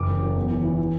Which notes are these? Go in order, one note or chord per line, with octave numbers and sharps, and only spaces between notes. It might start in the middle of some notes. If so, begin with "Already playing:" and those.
Already playing: F#1 E3 D6
F#2
F#3
E2
E3
E3
E3